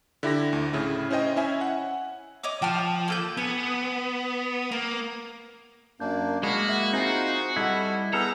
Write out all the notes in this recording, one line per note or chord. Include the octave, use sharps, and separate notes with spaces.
D3 E4 G4 A#6
D2
A2 C#3 E4
C#4 E4 C5 D#5 G5
C#4 E4 E5 G#5
F#5
C#5 D#5 D6
F3 G5 A5 F6
A#3 A4 G6
B3 G#5
A#3 A#5
F#2 A#3 D4 G6
G#3 A#3 F#4 B5 C7
E5 F#5
C4 D#4 F4 G#4 C5
G3 E4 A4 D#5 F#5
B3 G#4 A4 B4 A#5 E6 F6 G6